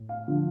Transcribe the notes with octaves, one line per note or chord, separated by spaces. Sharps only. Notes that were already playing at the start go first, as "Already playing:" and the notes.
Already playing: A2
F5
D3 F3